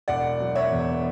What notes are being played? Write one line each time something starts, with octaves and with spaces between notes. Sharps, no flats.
E1 D5 F#5
F#3
C#5 E5
E2